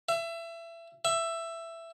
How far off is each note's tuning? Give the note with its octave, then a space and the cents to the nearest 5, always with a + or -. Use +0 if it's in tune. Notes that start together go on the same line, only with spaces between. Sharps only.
E5 +25
E5 +10